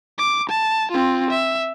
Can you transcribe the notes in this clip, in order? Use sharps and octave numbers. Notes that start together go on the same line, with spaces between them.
D6
A5
C4 F4
E5